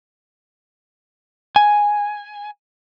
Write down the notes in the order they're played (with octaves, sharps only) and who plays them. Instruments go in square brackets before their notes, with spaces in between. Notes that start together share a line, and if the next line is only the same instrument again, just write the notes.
[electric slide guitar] G#5